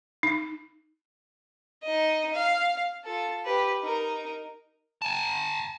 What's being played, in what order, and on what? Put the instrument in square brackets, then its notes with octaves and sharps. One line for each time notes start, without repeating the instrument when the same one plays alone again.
[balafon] D#4
[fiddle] D#4 D#5
F5
F4 A4
G4 B4
D#4 A#4
[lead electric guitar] G#5 A5